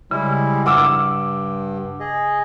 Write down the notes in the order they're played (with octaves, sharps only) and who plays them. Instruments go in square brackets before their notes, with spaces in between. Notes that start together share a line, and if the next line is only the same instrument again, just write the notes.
[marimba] C#3 [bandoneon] G3 G#3 E4
[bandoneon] G2 [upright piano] F#5 D6 E6 [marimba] F6
[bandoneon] G#4 D#5